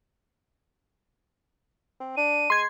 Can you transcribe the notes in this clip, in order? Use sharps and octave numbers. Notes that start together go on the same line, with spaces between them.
C4
D4 D#7
G#3 C6 G#6